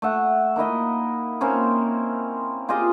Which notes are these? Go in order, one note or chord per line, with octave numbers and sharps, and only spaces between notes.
A3 E5 F#5
A#3 D#4 E4 D#5
A#3 C4 C#4 C5
F4 G4 G#4 D#5